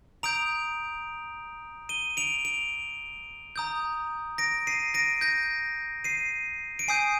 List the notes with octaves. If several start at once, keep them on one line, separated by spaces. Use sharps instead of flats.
A#5 D#6 G6 D7 F7
D#7 G7
D7 F7
D7 F7
A#5 D#6 G6
A#6 D7
C7 D#7
A#6 D7
G6 A#6
C7 D#7
D7
G#5 D#6 G6 C7 D#7